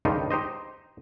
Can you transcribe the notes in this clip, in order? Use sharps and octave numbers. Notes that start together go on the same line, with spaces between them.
C#2 G2 D#3 D#4 F4 G4
D#4 G4 C5 D#5